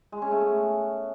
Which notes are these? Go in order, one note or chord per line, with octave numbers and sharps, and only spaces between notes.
G#3
C#4
A3
B3